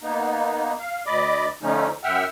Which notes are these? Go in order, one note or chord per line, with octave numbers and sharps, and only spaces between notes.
A#3 B3 D#4
F5
D2 D5 D#5 B5 D6
D3 F3 A3 C#4 D#4
F#2 E5 F#5 G5 E6 F6